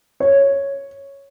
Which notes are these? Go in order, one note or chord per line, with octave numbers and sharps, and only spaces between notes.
C#5